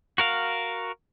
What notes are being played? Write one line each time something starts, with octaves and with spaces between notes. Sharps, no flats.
F#4 A#4 F5